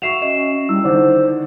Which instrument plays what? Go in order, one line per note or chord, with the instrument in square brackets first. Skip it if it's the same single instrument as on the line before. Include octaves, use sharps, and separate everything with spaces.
[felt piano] F#4 E5 C#6 [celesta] C7 E7 F7
[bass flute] C#4 [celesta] D#5 E7
[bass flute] G3 [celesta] E4 E6
[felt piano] D3 D#3 D4 [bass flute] C5